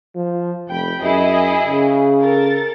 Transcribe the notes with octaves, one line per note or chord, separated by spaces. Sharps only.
F3
F1 G5 B5
F#2 E4 G#4 D#5
C#3
A4 A#4 A6